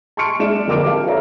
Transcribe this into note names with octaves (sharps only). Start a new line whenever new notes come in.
A5 C6 C#6 F6 C#7 D7
G#3 D4 D5 E5 D7 E7
F2 D3 A#4 D6 F6 D7
G4 A#4 F5 A5
A4 B4 C#5 D5 E5 A#5